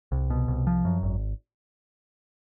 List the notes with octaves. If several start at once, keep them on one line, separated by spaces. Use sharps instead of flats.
C2
B2
C2
F3
F#2
G#1